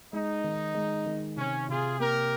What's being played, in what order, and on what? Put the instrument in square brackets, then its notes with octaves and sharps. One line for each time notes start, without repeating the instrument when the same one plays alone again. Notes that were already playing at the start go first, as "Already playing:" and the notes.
[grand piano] G#3 [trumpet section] D#4
[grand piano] D#3
G#3
D#3
[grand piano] C3 [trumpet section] C#4
[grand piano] C3 [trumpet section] F4 G#4
[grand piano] A#3 [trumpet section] G4 A#4